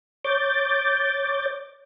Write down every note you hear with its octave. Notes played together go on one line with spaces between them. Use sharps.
C#5 D6 G6 A6